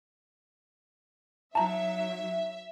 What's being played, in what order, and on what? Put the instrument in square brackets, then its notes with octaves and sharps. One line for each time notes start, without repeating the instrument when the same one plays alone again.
[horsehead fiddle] F#3 D#4 [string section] E5 [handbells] A5 A#5